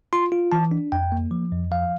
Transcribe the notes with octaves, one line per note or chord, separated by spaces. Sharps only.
F4 C6
F4
E3 A5
D4
F2 G5
A#3
F3
F2
F3 F5